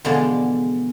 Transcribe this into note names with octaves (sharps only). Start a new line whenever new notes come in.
E2 B2 D3 F3 G#3 D5